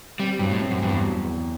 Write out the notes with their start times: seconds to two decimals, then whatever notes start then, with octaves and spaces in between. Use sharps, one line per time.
0.20 G3 C4
0.39 G2 F#3
0.51 A2
0.62 C4
0.71 F#2
0.82 E2 G2
1.04 F#3
1.24 E2